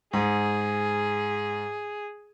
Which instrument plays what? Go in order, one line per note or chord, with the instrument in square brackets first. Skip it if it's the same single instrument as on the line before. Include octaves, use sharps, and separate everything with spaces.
[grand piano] G#2 [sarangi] G#4